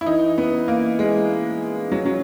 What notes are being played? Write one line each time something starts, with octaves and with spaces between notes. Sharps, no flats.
E4
E3 D#4
B3
A#3
G#3
F#3
F#3